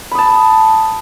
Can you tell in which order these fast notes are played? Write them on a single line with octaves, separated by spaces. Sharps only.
B5 D#6 A5